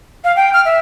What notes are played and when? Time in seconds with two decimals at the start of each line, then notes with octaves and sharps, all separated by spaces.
0.24 F5
0.37 G5
0.53 F6
0.65 E5